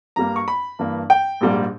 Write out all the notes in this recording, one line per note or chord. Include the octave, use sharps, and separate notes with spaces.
G2 G3 A#3 A#5
C#6
B5
G2 E3 A#3
G5
A#1 G#2 G3 A#3